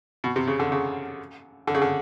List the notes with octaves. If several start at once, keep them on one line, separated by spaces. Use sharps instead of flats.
B2
C3
C#3
D3
C#3
D3
C#3
D3